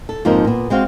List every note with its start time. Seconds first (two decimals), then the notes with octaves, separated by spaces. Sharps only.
0.09 A4
0.25 F2 G#2 F3 A#3 D#4 A#4
0.45 A#2 B3
0.70 G#3 C4 F#4 F5